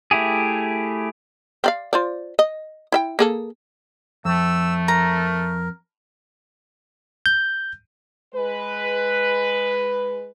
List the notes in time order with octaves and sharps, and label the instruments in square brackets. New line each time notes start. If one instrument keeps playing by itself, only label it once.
[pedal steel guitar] A3 E4 G4 G#4
[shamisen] C4 D5 F5
F4 C5 D5
D#5
E4 E5 G5
A#3 G#4 A4
[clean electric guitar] F2 [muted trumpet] A3 [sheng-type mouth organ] E6
[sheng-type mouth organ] A#4 [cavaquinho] A#5
[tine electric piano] G6
[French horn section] G#3 B4